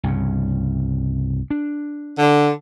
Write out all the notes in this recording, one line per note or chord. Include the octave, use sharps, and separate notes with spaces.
C2 G2 C#3
D4
D3